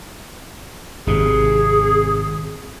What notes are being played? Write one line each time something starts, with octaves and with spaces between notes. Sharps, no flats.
G#1 C3 G#4